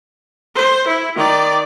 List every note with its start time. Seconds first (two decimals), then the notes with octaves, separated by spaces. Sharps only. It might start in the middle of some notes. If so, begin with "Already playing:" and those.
0.55 C5
0.87 E4
1.16 D#3 D5